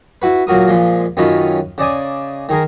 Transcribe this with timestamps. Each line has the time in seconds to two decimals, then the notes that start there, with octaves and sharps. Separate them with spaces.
0.22 E4 F#4 B4
0.47 A#2 F#3 F#4 A#4 D#6
0.68 A#2 F3 G#3
1.17 F#2 D#3 C#4 F4 B4 D#5
1.78 C#3 D5 D#5 G#5
2.49 D#3 G#4 A#4